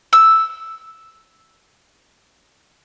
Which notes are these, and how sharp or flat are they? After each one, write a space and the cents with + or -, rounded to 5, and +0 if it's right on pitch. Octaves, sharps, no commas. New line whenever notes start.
E6 +0